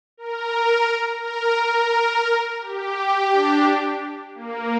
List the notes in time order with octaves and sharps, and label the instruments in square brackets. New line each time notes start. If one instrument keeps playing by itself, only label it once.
[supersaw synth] A#4
A#4
A#4
G4
D4
A#3